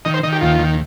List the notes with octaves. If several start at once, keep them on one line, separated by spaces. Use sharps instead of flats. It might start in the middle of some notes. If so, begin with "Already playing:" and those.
D#3 D#5
C5
D#3 D#5
G4
D#2 F4
D#3